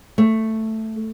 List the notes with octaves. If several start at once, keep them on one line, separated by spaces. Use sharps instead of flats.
A3